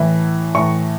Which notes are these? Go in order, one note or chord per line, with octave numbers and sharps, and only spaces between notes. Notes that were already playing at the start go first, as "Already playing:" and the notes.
Already playing: A2 E3
A2 E3 C#6